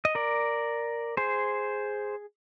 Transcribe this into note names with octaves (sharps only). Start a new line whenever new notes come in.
D#5
A#4 D5
G#4 C5